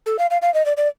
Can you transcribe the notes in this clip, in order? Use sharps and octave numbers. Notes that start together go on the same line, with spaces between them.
A4
F5
F5
F5
D#5
D5
D5